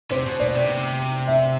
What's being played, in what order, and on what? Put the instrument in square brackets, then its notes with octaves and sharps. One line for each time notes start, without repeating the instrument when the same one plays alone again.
[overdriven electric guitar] C3 [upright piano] C5
[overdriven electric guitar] B2
[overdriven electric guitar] B2 [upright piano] D5
[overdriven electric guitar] C3
[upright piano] E5